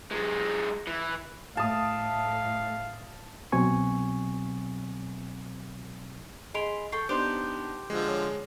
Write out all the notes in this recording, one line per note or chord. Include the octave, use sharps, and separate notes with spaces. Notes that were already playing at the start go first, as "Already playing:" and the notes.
F#2 G#3
E3
A2 F5 A5 D#6
C2 B2 F#3 C4 G#5 C#6
G#4 D#5 B5 C6 D7 F7
A4 G5 C#6 C7
B3 D4 D#4 G4 C5 C6 G6
D3 F3 G#3
C#5